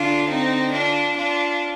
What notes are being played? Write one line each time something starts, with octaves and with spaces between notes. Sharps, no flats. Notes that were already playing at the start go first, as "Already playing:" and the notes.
Already playing: D3 D4 F4
C4 D#4
D4 F4
D4 F4